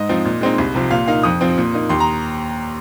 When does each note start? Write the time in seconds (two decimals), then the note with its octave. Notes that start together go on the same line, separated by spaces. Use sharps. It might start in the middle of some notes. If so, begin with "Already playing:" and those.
Already playing: G#2 D#5
0.09 F3 C4 D#4
0.25 A#2
0.41 G#3 C4 D#4
0.58 C2
0.75 C3 F3
0.91 A#2 F5
1.07 A#3 D#4 F5
1.23 F2 D#6
1.41 F3 C4
1.58 A#2
1.74 A#3 D#4
1.89 D#2 C6
2.00 A#5